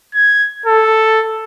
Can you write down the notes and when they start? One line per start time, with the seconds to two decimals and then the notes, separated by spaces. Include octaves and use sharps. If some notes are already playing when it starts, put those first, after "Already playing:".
0.15 G#6
0.66 A4